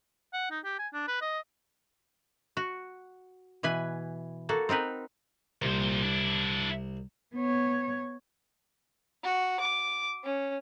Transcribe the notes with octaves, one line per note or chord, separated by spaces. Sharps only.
F#5
D#4
G4
G#5
D4
B4
D#5
F#4
B2 E3 B4 G#5
A#3 F#4 A4
C4 D#4 A#4 B4
C2 A#2 C5
D4 E4
B3 C#5
F#4
D6
C#4